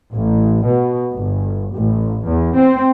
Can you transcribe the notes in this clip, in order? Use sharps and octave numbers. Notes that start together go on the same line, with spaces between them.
A1
B2
G1
A1
E2
C4